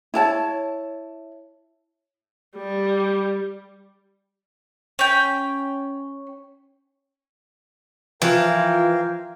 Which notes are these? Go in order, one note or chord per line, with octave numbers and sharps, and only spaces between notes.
E4 C#5 A5
G3
C#4 G5
E3 F3 F4 A#4 F5 G5